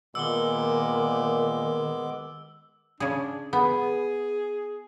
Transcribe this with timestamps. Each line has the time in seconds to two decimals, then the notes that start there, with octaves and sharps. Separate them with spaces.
0.15 A#2 D#3 G#3 B3 D6 E6 G7
3.00 C#3 D4 G#4
3.53 B3 G#4